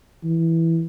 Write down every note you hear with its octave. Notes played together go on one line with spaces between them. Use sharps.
E3